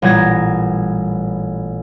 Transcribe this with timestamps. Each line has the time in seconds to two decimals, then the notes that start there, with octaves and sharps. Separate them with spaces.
0.02 A1 A#2 G3 B3 G#6 A#6